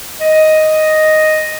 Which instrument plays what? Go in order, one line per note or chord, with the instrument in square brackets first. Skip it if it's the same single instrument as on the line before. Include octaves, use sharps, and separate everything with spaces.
[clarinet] D#5